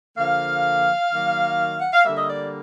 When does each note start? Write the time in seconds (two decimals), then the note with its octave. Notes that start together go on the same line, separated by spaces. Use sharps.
0.17 D3 F3 A#3 F5
1.11 D#3 F#3 A#3
1.80 F#5
1.93 F5
2.05 D3 G3 A#3 E5
2.17 D#5
2.28 D5